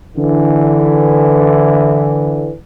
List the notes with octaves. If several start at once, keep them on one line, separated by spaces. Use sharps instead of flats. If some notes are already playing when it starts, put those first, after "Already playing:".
D3 E3